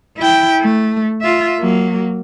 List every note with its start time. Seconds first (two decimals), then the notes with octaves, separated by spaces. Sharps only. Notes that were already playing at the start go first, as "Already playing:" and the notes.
0.18 E4 G5
0.61 A3
1.22 F4 E5
1.60 F#3 A#3